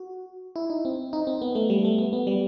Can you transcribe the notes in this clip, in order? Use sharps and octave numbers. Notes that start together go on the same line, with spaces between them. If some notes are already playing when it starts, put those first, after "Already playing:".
Already playing: F#4
E4
D#4
C4
D#4
C4
B3
A3
G3
A3
B3
B3
G3